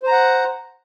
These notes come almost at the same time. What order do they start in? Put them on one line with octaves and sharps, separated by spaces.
C5 A#5 F#5